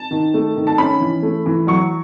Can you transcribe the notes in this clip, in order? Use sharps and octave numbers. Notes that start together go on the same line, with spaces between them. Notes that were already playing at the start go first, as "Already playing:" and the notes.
Already playing: A5
D#3
A3
D#3
A5
C#4 B5
E3
A3
E3
F#3 C#6